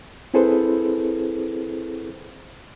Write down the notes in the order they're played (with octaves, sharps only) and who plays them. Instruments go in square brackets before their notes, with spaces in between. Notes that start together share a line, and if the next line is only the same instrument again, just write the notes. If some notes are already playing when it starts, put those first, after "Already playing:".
[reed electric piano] C4 E4 G#4 A4 B4 C5